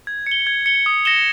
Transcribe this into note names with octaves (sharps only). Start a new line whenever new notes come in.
G#6
C#7 G7
G#6
C#7 G7
D#6
A#6 C#7 E7 G7